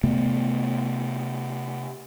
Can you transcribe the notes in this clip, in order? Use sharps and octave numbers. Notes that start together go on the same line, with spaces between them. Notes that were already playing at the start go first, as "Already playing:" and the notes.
C3 A3 B3